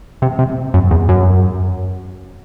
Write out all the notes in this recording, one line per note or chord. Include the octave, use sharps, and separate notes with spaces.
C3
C3
F#2
E2
F#2